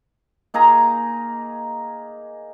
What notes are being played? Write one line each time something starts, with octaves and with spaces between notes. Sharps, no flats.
A#3 D#4 G#4 A#5